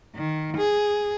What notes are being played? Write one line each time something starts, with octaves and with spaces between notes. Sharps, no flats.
D#3
G#4